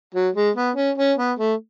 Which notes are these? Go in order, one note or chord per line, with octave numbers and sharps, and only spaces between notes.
F#3
G#3
B3
C#4
C#4
B3
A3